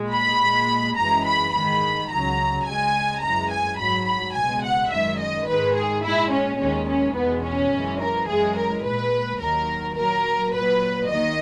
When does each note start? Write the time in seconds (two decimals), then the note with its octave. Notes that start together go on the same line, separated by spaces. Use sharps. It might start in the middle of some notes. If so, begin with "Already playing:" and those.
Already playing: A#2 G#3
0.13 B5
0.41 A#2 G#3
0.97 F#2 E3 G#3 A#5
1.26 B5
1.54 G#2 D#3 G#3 B5
2.10 C#2 C#3 F#3 A#5
2.66 C#2 C#3 G#3 G#5
3.22 F#2 E3 G#3 A#5
3.51 G#5
3.78 G#2 F#3 B5
4.07 B5
4.35 C#2 B2 G#3 G#5
4.63 F#5
4.91 F#2 D#3 G#3 E5
5.19 D#5
5.47 G#2 D#3 G#3 B4
5.75 G#4
6.03 A#2 G#3 E4
6.32 C#4
6.59 D#2 D#3 G#3 C#4
6.88 C#4
7.15 E2 B2 G#3 B3
7.44 C#4
7.72 F#2 E3 G#3
8.00 A#4
8.28 F#2 E3 G#3 G#4
8.56 A#4
8.84 A#2 G#3 B4
9.41 D#2 D#3 F#3 A#4
9.97 A#2 F#3 A#4
10.53 A#2 F#3 B4
11.09 D#2 D#3 D#5